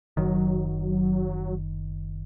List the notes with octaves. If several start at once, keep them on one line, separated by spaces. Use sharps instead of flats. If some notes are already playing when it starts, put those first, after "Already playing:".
F#1 D#3 F#3